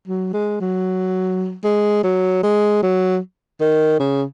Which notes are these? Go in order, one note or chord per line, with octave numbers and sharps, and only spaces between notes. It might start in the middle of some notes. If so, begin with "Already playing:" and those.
F#3
G#3
F#3
G#3
F#3
G#3
F#3
D#3
C#3